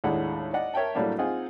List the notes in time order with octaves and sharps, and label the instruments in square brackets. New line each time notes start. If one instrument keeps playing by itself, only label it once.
[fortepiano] D#2 A2 G#3 D4 A4 F#5
D5 D#5 F#5
A#4 C#5 E5 G5 A5
A2 F#3 G3 A3 A#3 D4
C4 D#4 F4 G#4 F#5 G#5